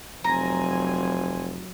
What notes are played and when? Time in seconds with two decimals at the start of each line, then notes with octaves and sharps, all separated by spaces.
0.24 F1 F#3 C4 G#5 A#5